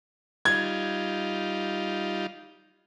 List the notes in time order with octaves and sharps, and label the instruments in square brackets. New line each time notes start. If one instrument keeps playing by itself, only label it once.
[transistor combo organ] G3 D#4 F4 [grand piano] G#6